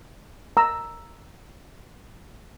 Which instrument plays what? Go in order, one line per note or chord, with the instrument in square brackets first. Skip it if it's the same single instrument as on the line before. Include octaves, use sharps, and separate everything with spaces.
[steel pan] A#5 E6